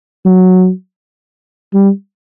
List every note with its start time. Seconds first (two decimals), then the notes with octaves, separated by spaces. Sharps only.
0.25 F#3
1.74 G3